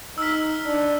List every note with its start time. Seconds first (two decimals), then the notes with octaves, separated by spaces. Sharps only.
0.18 D#4 E6 F6 B6
0.66 D4